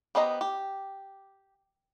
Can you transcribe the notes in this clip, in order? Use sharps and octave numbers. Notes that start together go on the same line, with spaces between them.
B3 G4 C5 D#5 A#5
G4